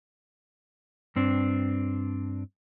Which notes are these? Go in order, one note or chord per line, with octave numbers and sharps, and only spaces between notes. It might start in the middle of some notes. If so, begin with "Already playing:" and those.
G2 C4 D4